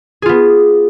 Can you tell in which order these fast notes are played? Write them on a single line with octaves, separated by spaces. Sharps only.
G#4 F4 B3